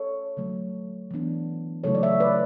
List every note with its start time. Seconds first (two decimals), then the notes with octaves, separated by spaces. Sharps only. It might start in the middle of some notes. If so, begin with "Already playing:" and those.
Already playing: A4 C#5
0.37 D3 F#3 A3
1.11 E3 B3 D4
1.84 C#3 F#3 A3 E4 A4 C#5
1.95 D5
2.03 C#5 E5
2.20 B4 D5